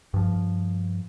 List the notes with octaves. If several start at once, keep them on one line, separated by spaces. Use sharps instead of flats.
G2 F3